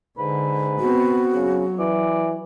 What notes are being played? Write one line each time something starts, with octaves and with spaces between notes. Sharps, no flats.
G#2 D3 B4
B3 C4 F#4
C#3 F#3
E3 D5